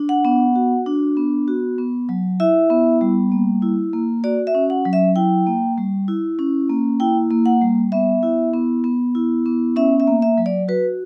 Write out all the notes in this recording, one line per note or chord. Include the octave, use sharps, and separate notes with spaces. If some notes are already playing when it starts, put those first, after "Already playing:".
Already playing: D4
F#5
B3
F#4
D4
B3
F#4
B3
F#3
E4 E5
B3
G3
A#3
E4
A#3
F#4 D5
E5
C#4
F#5
F#3
E5
E4 G5
A#3
G3
E4
C#4
A#3
E4 G5
A#3
F#5
G3
B3 E5
E4
B3
B3
E4
B3
C#4 E5
E5
A#3
E5
F#3
D5
F#4 B4